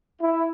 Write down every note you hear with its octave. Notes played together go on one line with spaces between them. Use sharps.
E4